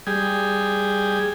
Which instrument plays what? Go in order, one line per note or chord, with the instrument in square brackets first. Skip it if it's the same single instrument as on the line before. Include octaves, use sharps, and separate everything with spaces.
[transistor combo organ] G3 G#4